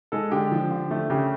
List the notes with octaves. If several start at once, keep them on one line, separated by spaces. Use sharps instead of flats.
G#3 A4
D3 G4
F3
D3
A3
C#3 G4